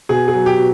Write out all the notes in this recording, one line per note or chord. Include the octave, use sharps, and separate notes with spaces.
B2 G#4
G#4
F#3
G4
B2